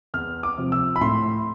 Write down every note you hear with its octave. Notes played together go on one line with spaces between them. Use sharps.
E2 F6
D6
C3 F3
E6
B5
A2 C6